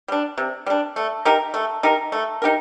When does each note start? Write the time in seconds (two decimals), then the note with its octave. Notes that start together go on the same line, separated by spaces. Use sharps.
0.08 G3 D4
0.38 C3
0.66 G3 D4
0.96 A3
1.25 D#4 G4 A#4
1.54 A3
1.83 D#4 G4 A#4
2.12 A3
2.42 D#4 G4 A#4